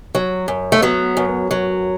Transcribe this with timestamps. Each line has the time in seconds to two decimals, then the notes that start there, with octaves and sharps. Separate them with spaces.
0.15 F#3
0.48 F#2
0.72 A3
0.82 F#3 B3
1.17 F#2
1.51 F#3